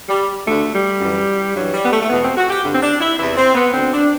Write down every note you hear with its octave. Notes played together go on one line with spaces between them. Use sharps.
G3
D2 D3 A3
G3
F#2 E3
G2 E3 F#3
G3
B3
A3
A3
E2 B2 B3
C4
F#4
G4
G2 D3
C4
D4
E4
E2 C3 E3 E4
C4
B3
D2 D3 C4
D4